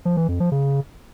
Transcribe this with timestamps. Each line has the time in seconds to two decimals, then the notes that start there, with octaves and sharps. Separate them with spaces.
0.05 F3
0.17 E3
0.28 F2
0.40 F3
0.52 C#3